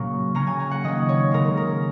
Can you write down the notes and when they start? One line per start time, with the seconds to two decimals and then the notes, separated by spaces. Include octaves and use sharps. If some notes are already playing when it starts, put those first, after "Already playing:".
Already playing: A#2 C#3 F#3 A#3 C#4 C#6
0.34 C#3 F#3 A#3 C#4 A#5
0.47 G#5
0.59 G#5
0.71 F#5
0.83 D#3 A#3 C#4 D#5
1.09 C#5
1.31 C#3 G#3 C#4 A#4
1.57 A#4